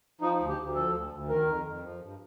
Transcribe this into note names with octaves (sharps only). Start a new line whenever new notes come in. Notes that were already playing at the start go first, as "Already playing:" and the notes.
F3 D#4
D2
G4
D2
F3 A4
D2
D2
D#3 A#4
F2
F2
F3
G2